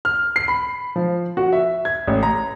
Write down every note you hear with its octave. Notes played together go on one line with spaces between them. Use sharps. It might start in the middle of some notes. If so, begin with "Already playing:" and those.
F6
C7
B5
F3
F#4
E5
G#6
A1
A#5